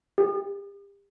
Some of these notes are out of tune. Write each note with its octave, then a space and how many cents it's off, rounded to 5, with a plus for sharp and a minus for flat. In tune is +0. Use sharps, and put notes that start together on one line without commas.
G4 +35